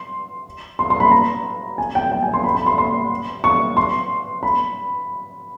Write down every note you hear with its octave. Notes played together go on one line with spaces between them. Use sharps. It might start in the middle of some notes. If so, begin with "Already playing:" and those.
Already playing: C6
C6
C6
B5
A#5
G#5
G5
G5
G#5
C6
B5
B5
C6
C6
C#6
C6
B5